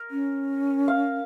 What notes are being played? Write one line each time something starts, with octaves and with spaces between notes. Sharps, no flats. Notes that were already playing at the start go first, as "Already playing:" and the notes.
Already playing: A#4
C#4
F5